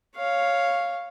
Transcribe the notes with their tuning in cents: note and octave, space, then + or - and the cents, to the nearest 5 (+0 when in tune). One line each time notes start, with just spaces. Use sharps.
C#5 +0 F5 +0